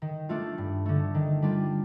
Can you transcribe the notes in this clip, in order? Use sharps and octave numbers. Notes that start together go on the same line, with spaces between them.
D#3
A3 D4 F4
G2
D3 A3
D#3
G3 D4 F4